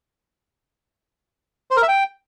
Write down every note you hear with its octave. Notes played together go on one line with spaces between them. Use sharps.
C5
A#4
E5
G5